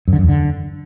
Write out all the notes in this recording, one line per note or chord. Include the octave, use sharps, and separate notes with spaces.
F#2
D3
F#2
E2
D3